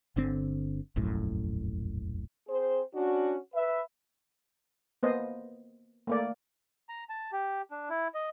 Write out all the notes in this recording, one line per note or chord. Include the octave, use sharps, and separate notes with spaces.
G1 D3 C4
E1 A#1 F#2 A2
C4 G#4 C5
C#4 D4 F#4
B4 E5
A#3 B3 C5 D#5
A3 A#3 D5
A#5
A5
G4
D4
E4
D#5